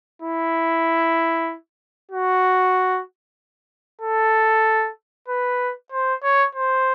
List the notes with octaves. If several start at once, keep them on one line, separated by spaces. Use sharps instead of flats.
E4
F#4
A4
B4
C5
C#5
C5